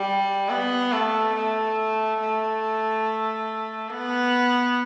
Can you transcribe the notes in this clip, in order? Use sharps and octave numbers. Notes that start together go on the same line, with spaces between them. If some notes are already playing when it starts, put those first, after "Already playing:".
Already playing: G3
B3
A3
A3
A3
B3